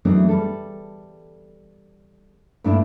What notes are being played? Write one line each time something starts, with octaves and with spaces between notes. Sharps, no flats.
E3 F#3 A3 B3 D4 D#4
G3 A4
G2 A#2 A3 D4 E4